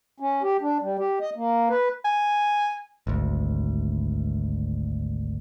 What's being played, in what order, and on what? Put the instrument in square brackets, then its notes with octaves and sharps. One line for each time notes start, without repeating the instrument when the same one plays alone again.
[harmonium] C#4
G4
D4
G3
G4
D#5
A#3
B4
[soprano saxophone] G#5
[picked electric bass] G#1 D2